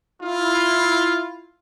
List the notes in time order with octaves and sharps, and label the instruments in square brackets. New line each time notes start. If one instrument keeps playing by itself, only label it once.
[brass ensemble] E4 F4